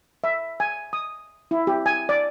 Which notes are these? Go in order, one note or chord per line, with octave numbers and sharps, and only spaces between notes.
E5
G#5
D#6
E4
G4
G#5
D5